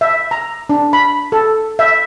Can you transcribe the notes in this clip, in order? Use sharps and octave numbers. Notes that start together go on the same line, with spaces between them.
E5
A#5
D4
B5
A4
E5